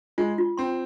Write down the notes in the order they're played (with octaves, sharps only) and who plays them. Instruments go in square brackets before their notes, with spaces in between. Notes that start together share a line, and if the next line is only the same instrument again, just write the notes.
[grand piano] G#3 [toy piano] F4
[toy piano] F4
[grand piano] C4 [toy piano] C6